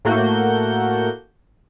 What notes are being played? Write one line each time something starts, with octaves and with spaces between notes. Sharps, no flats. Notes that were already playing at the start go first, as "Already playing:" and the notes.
A2 A3 A#3 F#4 G6